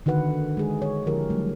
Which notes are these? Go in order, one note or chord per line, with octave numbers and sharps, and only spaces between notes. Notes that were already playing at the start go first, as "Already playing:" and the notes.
D3 D#3 F#4 B4 F#5
G#3 G#4
C#5
D3 F3 E4 G4 A#4
F#3 G3 A3